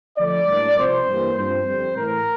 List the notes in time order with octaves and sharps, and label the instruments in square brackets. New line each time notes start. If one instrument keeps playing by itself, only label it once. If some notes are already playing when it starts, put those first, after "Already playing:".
[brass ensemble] D3 F3 A3 D4 D5
A2 G3 A#3 D4
C3 F3 C4 C5
G2 E3 G3 A#3
G2 F3 C4 C5
F2 D3 G3 C4
A2 E3 A3 A#4